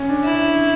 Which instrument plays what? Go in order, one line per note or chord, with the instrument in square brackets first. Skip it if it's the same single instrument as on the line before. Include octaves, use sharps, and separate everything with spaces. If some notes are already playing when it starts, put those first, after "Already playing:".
Already playing: [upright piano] C#4
D4
[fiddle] E4